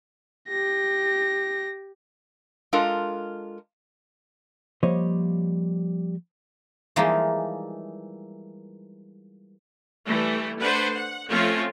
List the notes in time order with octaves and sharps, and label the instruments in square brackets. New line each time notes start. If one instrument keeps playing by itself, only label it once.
[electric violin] G4 A#6
[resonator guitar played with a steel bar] G#3 D4 F4 A4 A#4
[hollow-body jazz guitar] F3 G3 A#3 C5 C#5 D#5
[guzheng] E3 F3 G3 G#3 A#3 D#4
[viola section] E3 G3 A3
A3 D4 B4 C5 F#5
F#5
F3 A3 C4 C#4 F4 C#5